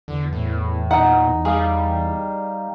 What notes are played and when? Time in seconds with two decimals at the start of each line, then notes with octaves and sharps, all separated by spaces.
0.08 E2 D3
0.33 A2
0.91 A#2 D#4 F#5
1.45 G3 G#4 F5